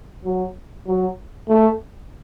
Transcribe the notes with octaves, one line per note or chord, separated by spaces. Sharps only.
F#3
F#3
A3